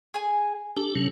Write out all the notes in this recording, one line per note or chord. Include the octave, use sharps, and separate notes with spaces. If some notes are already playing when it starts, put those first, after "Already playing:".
G#4 G#5
D4 G4 A4
C3 F#3 C#4